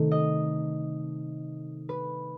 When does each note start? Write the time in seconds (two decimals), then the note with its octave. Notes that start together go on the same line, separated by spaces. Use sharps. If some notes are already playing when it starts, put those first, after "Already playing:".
Already playing: C3 D#3 A3
0.11 D#5
1.89 B4